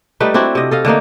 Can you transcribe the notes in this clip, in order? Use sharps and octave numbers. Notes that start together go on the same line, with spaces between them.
G3 A3 D#4 B4
C4 D4 E4 F#4
C3 D#5
A4 D#5 F5
D3 A3 A#3 D#4